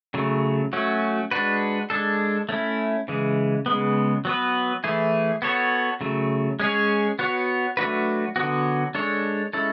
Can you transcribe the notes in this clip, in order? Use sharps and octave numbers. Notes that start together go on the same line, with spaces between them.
C#3 F#3 A3
F#3 A3 C#4 F#4
G#3 D4 F#4 B4
G#3 D4 A4
A3 C#4 E4
C#3 E3 G#3
C#3 G#3 B3
F#3 B3 F#4 B4
E3 A3 E4 G#4
B3 F#4 A4 C#5
C#3 F#3 A3
G#3 C#4 G#4 C#5
B3 F#4 C#5
F#3 A3 D4 F#4 B4
D3 F#3 B3 F#4
G#3 D4 A4 C#5
G#3 C#4 E4 A4